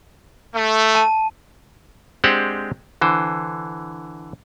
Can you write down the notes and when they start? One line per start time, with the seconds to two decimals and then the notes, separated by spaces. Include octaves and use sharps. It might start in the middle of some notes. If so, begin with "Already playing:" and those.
0.54 A3
0.95 A5 D#7
2.24 G#3 C4 D4 G4 C5 F#5
3.01 D3 E3 C5